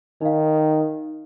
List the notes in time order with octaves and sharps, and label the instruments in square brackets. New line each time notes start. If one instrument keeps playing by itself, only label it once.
[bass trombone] D#3 [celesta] D#4 F5